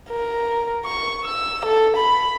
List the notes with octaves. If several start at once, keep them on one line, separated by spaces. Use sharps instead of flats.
A#4
C#6
E6
A4
B5